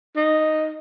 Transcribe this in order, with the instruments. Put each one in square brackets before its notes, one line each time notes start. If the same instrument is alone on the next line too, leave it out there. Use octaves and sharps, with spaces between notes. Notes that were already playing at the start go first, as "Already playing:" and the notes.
[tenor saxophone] D#4